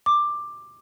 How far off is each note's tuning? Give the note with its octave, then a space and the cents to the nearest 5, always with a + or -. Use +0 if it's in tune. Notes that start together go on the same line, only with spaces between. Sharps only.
D6 +10